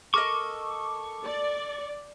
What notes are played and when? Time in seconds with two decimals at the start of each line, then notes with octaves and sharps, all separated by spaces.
0.14 A4 A#4 D#5 C#6 D6
1.25 D5